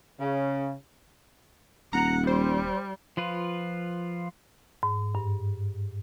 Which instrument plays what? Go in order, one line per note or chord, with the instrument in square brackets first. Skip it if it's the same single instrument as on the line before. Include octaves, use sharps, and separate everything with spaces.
[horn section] C#3
[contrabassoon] D#1 [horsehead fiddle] F#5 [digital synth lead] A#5
[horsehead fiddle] G3 [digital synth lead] C5
[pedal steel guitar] F3 F4 B4
[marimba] G#2
G2